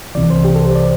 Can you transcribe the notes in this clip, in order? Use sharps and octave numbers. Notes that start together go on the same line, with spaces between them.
C2 C3 E3 D5
C5
G4
A4
C5
D5